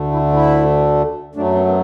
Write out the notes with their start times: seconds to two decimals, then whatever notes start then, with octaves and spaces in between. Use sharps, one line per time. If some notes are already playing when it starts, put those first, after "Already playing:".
Already playing: D2 D3 A3
0.12 E4
0.33 E4
1.35 F#2 F#3 A3 D4
1.55 B3
1.67 B3